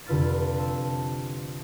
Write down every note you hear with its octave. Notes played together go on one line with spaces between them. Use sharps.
F1 D3 F4 B4 F6 A6
C5 A5 E6